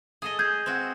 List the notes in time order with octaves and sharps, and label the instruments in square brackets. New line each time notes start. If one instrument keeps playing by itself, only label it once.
[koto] G#4 A4 D#5
[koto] G#4 [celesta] G6 G#6
[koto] C4 F#4